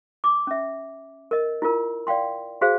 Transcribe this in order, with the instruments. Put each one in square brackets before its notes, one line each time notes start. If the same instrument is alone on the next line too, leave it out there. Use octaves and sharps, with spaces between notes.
[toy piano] D6
C#4 E5
A#4 D#5
E4 F4 A#4
D5 F5 G5 C6
F#4 G#4 C5 F5